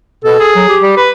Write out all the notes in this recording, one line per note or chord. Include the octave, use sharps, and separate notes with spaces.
B2 A4
G#4
F#3
G4
G3
B4